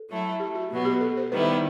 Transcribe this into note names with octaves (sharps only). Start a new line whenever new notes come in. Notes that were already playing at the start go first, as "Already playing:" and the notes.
Already playing: A4
F#3 A3 E4
G4
F#4
B2 F#3 B3
G4
A4
C5
D#3 G3 B3 E4 B4